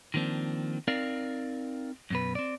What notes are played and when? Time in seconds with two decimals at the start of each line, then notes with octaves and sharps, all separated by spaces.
0.14 D#3 F3 A#3 C4 D4
0.88 C4 D#4 A#4 D5 F5
2.10 F#2 B2 B4
2.35 C4 D5